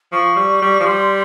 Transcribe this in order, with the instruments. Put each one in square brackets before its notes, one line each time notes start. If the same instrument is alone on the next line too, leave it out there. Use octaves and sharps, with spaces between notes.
[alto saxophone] F3 [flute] C#6
[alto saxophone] G3
G3
F3
[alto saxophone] G3 [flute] C6